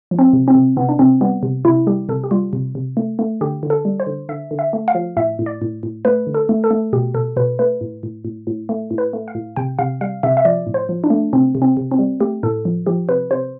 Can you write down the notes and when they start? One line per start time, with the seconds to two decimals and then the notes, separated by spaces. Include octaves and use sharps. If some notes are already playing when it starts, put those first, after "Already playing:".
0.11 F3
0.19 C4
0.33 C3
0.48 C4
0.55 C3
0.77 C3 B3
0.89 D4
0.99 C3 C4
1.21 G3 B3
1.43 C3
1.65 C3 E4
1.87 G3 G4
2.09 C3 A4
2.24 G4
2.31 G3 F4
2.53 C3
2.75 C3
2.97 A3
3.19 A3
3.41 D3 G4
3.63 D3
3.70 A4
3.85 G3
4.00 C5
4.07 D3
4.29 D3 E5
4.51 D3
4.59 E5
4.73 A3
4.88 F5
4.95 F3
5.17 A2 E5
5.39 A2
5.46 D5
5.62 A2
5.83 A2
6.05 A3 B4
6.27 D3
6.34 A4
6.49 A3
6.64 A4
6.71 A3
6.93 B2 G4
7.14 B2 A4
7.36 B2 B4
7.59 A3 B4
7.81 A2
8.03 A2
8.25 A2
8.47 A2
8.69 A3
8.91 A2
8.98 B4
9.13 A3
9.28 F5
9.35 A2
9.56 C3 G5
9.79 C3 F5
10.01 G3 F5
10.23 C3 E5
10.37 E5
10.45 F3 D5
10.67 A2
10.74 C5
10.89 F3
11.04 D4
11.10 A3
11.33 C3 C4
11.55 C3
11.62 C4
11.77 C3
11.91 C4
11.99 G3
12.21 A3 G4
12.43 A2 A4
12.65 F3
12.86 F3 G4
13.09 C3 B4
13.31 C3 C5